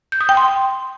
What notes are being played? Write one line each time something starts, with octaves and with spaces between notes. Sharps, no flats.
G6
D#6
G5
C6